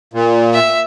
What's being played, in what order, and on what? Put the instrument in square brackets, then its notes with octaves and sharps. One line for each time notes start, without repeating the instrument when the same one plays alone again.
[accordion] A#2
[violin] E5